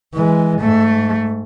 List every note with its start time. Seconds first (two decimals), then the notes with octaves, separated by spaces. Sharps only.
0.14 E3 G#3
0.61 G#2 A3